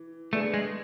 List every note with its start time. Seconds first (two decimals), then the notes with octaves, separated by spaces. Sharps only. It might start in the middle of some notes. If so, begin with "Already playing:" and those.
Already playing: E3
0.33 A3 B3 D4 G#4
0.54 G#3